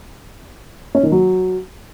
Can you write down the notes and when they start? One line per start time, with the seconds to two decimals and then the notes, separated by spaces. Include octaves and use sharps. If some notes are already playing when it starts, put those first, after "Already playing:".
0.95 C#4
1.03 D#3
1.12 F#3